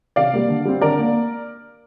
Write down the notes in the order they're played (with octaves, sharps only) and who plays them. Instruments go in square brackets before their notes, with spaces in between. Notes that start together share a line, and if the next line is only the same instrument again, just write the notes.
[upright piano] C3 D5 F5
G3 A#3
D3
G3 C4
D3 A#4 D5
A#3